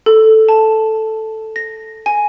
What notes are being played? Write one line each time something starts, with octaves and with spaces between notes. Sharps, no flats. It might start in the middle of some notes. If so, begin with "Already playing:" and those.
A4
A5
A#6
G#5